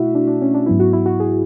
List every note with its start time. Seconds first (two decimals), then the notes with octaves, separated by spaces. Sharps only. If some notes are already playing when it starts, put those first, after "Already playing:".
Already playing: B2 A3 E4 F#4 E5
0.15 D4
0.28 D4
0.41 C#4
0.54 D4
0.66 G#2 F#3 B3 E4
0.80 F#4
0.93 E4
1.06 F#4
1.20 G#4